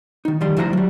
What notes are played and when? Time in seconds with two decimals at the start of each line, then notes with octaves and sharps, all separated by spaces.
0.25 D#3 D#4
0.41 D#3 F3 G3 C6
0.57 D2 F3 E4 C5 F#5 A#5
0.73 F#3 G3